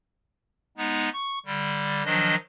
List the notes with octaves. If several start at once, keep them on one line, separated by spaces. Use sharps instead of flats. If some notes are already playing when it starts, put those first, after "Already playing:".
G#3 B3 D#4
C#6
D3 G3
D#3 F3 F#3 D4 D#5